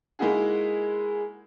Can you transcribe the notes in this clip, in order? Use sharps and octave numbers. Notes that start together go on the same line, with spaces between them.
G#3 A#3 D#4 E4 F#4 G#4